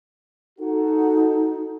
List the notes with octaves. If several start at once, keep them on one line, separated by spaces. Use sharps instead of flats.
D#4 F#4 A4